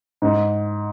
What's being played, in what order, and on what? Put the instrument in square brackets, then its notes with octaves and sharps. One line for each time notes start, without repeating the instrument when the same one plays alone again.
[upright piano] G#2